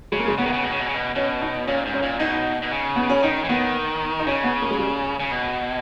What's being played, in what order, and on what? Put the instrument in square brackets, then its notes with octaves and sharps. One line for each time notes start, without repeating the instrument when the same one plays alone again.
[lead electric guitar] C#3 [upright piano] G#3
[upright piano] A#3
G#3
[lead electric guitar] C#3 [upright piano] B3
[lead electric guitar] D#3
C#3
B2
C#3
B2
C#3
B2
[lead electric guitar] B2 [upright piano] C#4
[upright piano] D#4
[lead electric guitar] A#2 [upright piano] C#4
[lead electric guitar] G#2
[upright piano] C#4
[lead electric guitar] A#2
[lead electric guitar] B2 [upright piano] D#4
[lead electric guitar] B2
C#3
[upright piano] B3
C#4
[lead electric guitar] D#3 [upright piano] D#4
[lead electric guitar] E3
[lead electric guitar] D#3 [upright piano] B3
[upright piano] D#4
[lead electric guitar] C#3 [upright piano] C#4
[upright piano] B3
A#3
G#3
G3
[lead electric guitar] C#3
B2